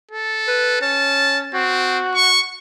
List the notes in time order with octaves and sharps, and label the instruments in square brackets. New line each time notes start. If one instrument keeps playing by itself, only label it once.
[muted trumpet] A4
[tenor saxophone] B4
[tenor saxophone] C#4 [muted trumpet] A5
[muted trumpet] C4 [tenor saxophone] F#4
[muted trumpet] C#6